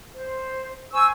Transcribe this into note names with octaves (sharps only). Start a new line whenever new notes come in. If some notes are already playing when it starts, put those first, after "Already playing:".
C5
C5 G#5 C#6 E6